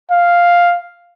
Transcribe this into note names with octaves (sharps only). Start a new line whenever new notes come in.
F5